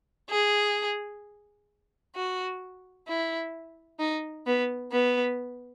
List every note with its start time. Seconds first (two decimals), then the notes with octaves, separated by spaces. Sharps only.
0.30 G#4
2.15 F#4
3.08 E4
3.99 D#4
4.46 B3
4.92 B3